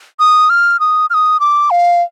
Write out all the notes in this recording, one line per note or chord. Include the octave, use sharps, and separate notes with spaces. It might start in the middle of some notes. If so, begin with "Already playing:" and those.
D#6
F6
D#6
F6
D#6
D6
F5